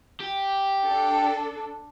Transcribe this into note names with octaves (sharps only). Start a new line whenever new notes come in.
G4
D4 A4